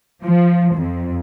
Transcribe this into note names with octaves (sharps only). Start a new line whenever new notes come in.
F3
F2